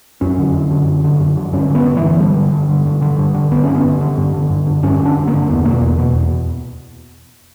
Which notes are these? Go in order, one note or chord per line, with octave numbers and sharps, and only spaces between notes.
F#2 C#4
D3
F#2
D3
F#2
D3
F#2
D3
G2 C#4
D3 B3
G2
E3
D3
G2 G3
D3
G2
D3
G2
D3
G2
D3
G2 B3
D3 C#4
B3
G2
D3
G2
D3
G2
D3
G2 C#4
D3
D4
G2
A#3
D3
E2 B3
B2 A#3
E2
B2
E2